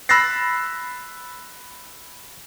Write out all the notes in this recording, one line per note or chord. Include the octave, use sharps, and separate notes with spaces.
B5 E6 F#6 A6 A#6 C7